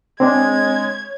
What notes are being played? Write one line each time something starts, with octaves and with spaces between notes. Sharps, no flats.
G#3 C4 D4 C#5 G#6